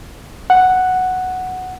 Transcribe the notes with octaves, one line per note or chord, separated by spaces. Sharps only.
F#5